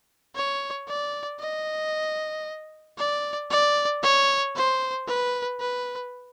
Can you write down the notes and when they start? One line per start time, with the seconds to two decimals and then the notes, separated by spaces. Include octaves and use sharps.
0.35 C#5
0.88 D5
1.40 D#5
2.98 D5
3.50 D5
4.03 C#5
4.56 C5
5.07 B4
5.60 B4